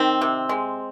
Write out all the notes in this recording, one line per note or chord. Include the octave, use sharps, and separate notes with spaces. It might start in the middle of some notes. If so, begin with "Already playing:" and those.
Already playing: D#3 C4
C3
G#3